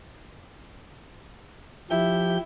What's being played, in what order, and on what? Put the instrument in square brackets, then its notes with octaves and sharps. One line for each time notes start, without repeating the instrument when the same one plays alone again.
[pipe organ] F3 G4 G6 [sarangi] E4